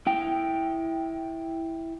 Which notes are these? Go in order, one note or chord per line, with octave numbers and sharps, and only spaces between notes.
E4 G5